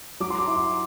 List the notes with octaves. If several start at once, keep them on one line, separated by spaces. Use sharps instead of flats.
F#3 D6
C6
D6
E4
C6